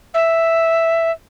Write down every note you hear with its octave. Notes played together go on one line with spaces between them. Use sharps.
E5